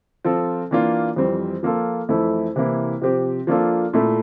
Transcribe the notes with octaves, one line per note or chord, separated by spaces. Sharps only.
F3 C4 F4 A4
E3 A#3 D4 F4
F2 E3 G3 C4
F3 A#3 F4 A4
F2 E3 A3 E4 A4
C3 E3 A#3 E4
C3 F3 C4 G4
F3 A#3 D4 F4 A4
A#2 A3 E4 A4